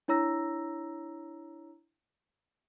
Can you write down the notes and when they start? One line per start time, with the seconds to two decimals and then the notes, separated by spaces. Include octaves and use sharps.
0.08 D4 E4 C#5 A#5 E6 A#6